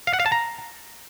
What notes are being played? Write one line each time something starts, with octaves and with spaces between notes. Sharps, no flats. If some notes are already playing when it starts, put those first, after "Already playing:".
F5
F#5
F5
A5
A#5